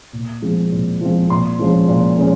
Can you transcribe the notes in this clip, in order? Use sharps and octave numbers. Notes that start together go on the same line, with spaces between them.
A#2
F3 G#3 C4
A#2
F3 G#3 C4
A#2 C6
F3 G#3 C#4
A#2
F3 G#3 C#4